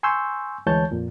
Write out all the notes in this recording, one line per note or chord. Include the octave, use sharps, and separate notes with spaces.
G#5 C6 C#6 E6 G6
D2 E3 G#3 C#5 A5 G6
F2 A#2